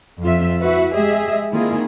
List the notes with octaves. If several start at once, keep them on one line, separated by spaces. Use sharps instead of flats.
F2 F4 E5
E4 F#4 B4 E5
G#3 G4 G#4 D#5 E5
D#3 A#3 C4 E4 F4 G#4